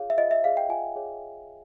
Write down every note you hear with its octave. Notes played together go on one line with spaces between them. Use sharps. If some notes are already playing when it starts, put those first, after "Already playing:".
Already playing: F4 G#4 C#5 F5
E5
F4 D#5
E5
G#4 C#5 F5
G5
F4 G#5
G#4 C#5